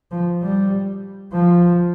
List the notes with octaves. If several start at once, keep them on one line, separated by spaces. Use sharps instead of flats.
F3
G3
F3